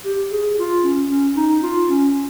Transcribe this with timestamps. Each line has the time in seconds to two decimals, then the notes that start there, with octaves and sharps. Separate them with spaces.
0.05 G4
0.31 G#4
0.59 F4
0.84 C#4
1.10 C#4
1.36 D#4
1.63 F4
1.89 C#4